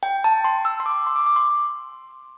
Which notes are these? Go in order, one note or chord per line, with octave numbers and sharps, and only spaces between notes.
G5
A5
C6
E6
C6
D6
C6
D6
D6
C6